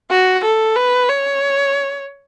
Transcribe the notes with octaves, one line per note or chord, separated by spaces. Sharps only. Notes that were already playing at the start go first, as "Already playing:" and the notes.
F#4
A4
B4
C#5